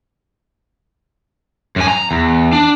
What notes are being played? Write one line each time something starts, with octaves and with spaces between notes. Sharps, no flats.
F#2 G#5
A#5
E2
D4